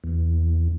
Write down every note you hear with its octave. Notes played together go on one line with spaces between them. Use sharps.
E2